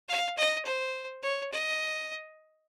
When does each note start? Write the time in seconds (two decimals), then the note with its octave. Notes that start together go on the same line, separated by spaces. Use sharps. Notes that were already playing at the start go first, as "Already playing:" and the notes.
0.08 F5
0.37 D#5
0.65 C5
1.22 C#5
1.52 D#5